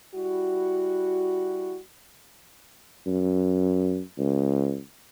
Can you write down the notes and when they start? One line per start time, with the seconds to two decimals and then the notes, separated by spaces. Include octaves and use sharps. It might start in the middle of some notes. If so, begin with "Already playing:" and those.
0.14 G3 E4 F#4
3.06 F#2
4.18 C#2